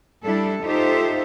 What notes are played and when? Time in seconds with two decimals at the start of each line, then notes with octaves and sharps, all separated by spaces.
0.24 G3 D4 E4 A4
0.63 D#4 F4 G4 A4 C5 E5